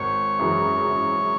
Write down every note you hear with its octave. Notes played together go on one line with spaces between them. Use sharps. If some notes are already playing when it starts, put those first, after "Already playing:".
Already playing: G#1 C#5
F#2 C#3 E3
G#1